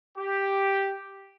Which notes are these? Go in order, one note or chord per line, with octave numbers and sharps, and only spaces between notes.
G4